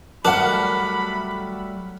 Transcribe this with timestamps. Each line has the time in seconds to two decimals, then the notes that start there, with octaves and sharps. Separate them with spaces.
0.25 F#3 G3 A3 D4 A#4 F#5 B5